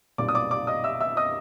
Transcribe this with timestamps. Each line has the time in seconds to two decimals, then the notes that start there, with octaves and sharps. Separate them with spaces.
0.18 B1 A#2 G3 C4 D5 D6
0.29 D#6
0.34 D5 D6
0.51 D5 D6
0.67 D#5 D#6
0.84 E5 E6
1.01 E5 E6
1.17 D#5 D#6